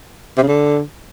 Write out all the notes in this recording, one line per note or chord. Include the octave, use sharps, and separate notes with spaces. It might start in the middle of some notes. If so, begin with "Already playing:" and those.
C3
C#3
D3